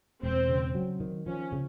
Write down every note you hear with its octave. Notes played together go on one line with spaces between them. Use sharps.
E1 C4
C#3
F#3
D#3
F3 C#4
C#3